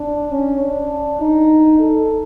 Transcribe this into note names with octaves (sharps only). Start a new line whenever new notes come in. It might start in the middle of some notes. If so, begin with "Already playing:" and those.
Already playing: D4
C#4
D4
D#4
A4